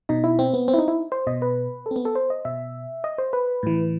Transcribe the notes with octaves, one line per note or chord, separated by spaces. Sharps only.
B2 D#4
E4
C4
B3
C4
E4
D#4
E4
C5
B2 D#5
B4
A4
C4
B3
A4
C5
D#5
B2 E5
D#5
C5
B4
A2 E3